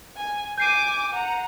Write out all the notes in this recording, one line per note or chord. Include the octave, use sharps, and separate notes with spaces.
G#5
G#5 D6 G6 C7 D#7
F#5 A#5